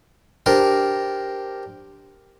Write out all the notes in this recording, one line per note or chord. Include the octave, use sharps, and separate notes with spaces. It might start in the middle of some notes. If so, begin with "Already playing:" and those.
D4 G4 A#4 C5